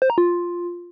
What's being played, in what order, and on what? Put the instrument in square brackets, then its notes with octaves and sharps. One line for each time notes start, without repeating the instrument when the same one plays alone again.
[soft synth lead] C5
A#5
F4